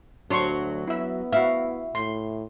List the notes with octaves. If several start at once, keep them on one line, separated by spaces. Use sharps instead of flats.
D2 F#3 D4 C6 C#6
B3 E4 E5
E4 F#4 F5
A2 C6